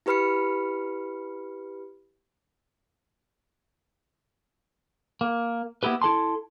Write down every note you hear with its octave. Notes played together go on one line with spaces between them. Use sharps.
E4 G4 B4 B5 F6 C#7
A#3
A#3 B3 E4 G4 B4
E4 A4 A5 C6